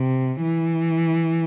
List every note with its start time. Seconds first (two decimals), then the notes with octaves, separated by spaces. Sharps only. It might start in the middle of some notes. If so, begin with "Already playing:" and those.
Already playing: C3
0.42 E3